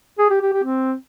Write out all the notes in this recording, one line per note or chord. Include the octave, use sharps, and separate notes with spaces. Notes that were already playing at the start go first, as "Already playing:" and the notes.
G#4
G4
G4
G4
C4